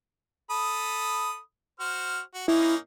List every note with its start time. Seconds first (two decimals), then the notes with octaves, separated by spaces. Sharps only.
0.50 A4 B5 D#6
1.80 F#4 C5 F6
2.34 F#4
2.48 A#3 C#4 D#4 E4